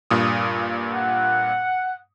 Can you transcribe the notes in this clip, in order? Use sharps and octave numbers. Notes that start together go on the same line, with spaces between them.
G2 A#2 D#6
F#5